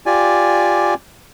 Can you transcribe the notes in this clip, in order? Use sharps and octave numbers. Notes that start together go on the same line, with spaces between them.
F4 G4 D5 G#5